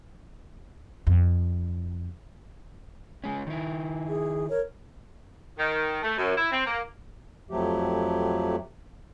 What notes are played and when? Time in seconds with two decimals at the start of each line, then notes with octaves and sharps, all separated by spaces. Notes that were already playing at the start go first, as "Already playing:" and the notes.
1.07 F2
3.24 G#3 C#4
3.47 D#3 E4
4.08 G#4
4.49 A#4 C#5
5.59 D#3
6.03 A3
6.18 F#2
6.38 E4
6.52 C4
6.66 A#3
7.51 F2 F3 F#3 A3 G4